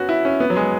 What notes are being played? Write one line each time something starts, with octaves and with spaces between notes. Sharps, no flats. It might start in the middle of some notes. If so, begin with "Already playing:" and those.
Already playing: B3 C#4 F#4
E4
C#4
B3
F#3
G#3